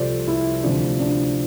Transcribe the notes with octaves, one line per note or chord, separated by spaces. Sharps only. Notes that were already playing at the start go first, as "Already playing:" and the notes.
Already playing: C2 C3 F3 F4 A4 C5 D5
E4
D2 C3 F3 D4
D4